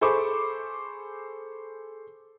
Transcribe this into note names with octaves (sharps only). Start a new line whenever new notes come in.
G#4 A4 C5 B5 C#6 D6